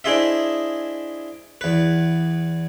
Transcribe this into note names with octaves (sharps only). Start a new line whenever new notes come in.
D4 E4 G#4 C5 D#5 E5
E2 B4